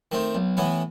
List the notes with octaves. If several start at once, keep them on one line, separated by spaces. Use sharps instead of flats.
D#3 A3 C4
B1
A2 E3 B3